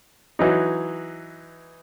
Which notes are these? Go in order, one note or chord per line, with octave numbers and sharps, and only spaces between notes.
E3 F#3 D#4